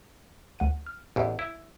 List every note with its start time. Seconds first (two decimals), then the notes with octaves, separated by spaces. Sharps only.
0.59 D2 F#5 D#7
0.86 F6
1.16 A1 E2
1.39 E4